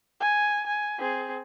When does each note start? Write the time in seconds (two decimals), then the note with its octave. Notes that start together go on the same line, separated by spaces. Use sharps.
0.20 G#5
0.67 G#5
0.99 C4 G#4